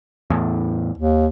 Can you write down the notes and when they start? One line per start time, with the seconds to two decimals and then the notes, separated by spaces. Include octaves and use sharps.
0.30 E2 A2
0.98 D#2